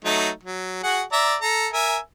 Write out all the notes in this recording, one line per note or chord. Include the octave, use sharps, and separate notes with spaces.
F#3 A3 D#4
F#3
F#4 G#4 F#5
D5 E5 A#5
A4 A#5
A#4 E5 G#5